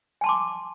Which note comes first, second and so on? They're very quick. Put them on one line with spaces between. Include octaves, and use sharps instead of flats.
G#5 A5 C6 D6